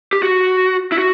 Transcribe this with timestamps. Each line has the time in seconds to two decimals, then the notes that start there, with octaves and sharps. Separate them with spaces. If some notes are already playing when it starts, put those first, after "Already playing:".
0.13 G4
0.23 F#4
0.92 E4
0.98 F#4